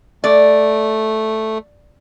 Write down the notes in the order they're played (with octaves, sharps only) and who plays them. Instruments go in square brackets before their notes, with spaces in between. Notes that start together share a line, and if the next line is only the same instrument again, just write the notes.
[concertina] A3 [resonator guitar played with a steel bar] D5